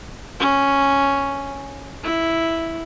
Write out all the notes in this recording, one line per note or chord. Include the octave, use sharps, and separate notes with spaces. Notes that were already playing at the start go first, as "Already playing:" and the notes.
C#4
E4